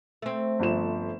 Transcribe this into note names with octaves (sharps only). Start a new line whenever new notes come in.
A3 C4
G1 F3 E7